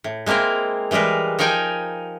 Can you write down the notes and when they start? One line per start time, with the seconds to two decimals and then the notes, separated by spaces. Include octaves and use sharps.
0.04 A2
0.26 G#3 A#3 C4 E4 A#4
0.91 E3 G3 G#3 A#4 B4
1.39 F3 D#4 A#4 G5 G#5